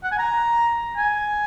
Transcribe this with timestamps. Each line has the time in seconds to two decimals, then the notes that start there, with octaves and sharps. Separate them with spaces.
0.04 F#5
0.12 G#5
0.19 A#5
0.97 G#5